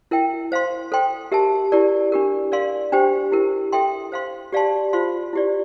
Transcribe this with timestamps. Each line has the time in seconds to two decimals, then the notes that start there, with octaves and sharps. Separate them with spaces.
0.11 E4 A#4 E5 G5
0.52 C5 F5 C6
0.92 A4 C5 G5 C6
1.32 G4 A#4 E5 A5
1.72 E4 G4 A#4 D5
2.12 D4 G4 A#4
2.52 A#4 D5 F5 C6
2.92 D4 G4 C5 G5
3.32 E4 G4 A#4
3.72 A4 E5 G5 C6
4.12 C5 F5 C6
4.53 G4 D5 F5 A5 C6
4.93 F4 C5 F5 C6
5.33 E4 G4 D5